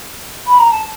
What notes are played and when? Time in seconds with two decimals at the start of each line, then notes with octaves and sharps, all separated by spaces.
0.47 B5
0.59 A#5
0.71 A5